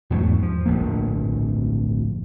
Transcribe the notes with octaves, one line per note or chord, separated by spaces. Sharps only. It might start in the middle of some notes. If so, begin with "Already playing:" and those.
E2 G#2 F#3 A3
F3
D1 A#1 G2 A#3